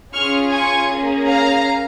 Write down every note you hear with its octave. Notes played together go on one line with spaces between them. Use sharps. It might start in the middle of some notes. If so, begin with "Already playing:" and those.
C#4 F4 G#4 C#6 F6
G#5 C#6
A#3 C#4 G#4
F5 A#5